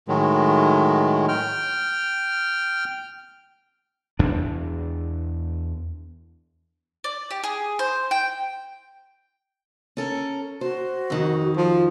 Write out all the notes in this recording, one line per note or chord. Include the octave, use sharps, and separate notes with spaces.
A2 D#3 F#3 G#3
G5 F6
E2 D4
D5
G4
G#4
C5
G5
C#4 A4 A#4
F#4 C5
F2 D#3
F3